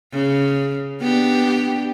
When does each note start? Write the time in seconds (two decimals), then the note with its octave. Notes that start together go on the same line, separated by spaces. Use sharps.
0.13 C#3
1.01 B3 D4 G4